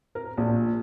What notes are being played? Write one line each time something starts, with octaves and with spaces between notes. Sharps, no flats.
A#4
A#1